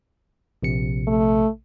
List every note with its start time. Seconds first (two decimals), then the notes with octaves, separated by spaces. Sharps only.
0.63 A#1 C3 C#7
1.07 A3